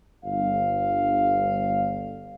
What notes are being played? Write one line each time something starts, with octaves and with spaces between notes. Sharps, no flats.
G1 F5